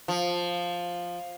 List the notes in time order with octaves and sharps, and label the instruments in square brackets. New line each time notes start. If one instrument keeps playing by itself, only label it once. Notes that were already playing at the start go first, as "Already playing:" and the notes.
[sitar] F3